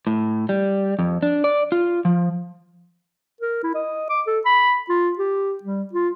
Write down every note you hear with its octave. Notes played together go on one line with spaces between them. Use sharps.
A2
G3
F2
D4
D5
F4
F3
A#4
E4
D#5
D6
A4
B5
F4
G4
G3
F4